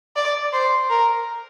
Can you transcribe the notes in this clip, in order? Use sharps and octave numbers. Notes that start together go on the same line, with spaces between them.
D5
C5
A#4